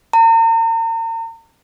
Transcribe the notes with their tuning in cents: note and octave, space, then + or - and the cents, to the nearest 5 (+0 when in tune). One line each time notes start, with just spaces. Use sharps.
A#5 -40